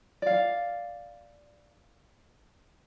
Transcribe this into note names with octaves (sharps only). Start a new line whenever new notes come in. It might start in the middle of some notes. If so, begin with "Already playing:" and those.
D5 F5